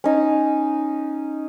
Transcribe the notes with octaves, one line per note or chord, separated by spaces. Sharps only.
C#4 D#4